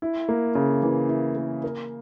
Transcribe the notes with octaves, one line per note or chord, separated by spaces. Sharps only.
E4
A#3
C#3
E3
E4
A#3
A#4